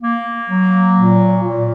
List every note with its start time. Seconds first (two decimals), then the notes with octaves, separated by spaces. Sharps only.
0.02 A#3
0.48 F#3
0.95 A#2
1.42 A#2